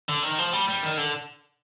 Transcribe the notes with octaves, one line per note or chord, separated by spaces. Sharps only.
D3
D#3
F3
G3
G3
D#3
D3